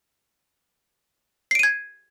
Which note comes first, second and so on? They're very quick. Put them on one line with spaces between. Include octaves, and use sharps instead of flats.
C7 D7 D#7 G#6